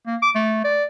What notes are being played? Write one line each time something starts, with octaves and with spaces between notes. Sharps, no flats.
A#3
D6
A3
D5